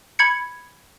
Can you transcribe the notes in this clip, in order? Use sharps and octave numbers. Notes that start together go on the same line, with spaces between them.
B5 G#6 C#7